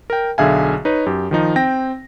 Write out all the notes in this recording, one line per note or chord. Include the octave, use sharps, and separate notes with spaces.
A#4 G5
B1 D3 G#4 E5 F5 G#5
D#4 B4 C#5
F#2 G4
D#3 F3 D#4
C4 G5 A#6